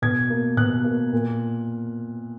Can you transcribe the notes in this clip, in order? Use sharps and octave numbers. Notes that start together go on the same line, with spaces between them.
B2 G#6
A#3
B2 F#6
A#3
A#2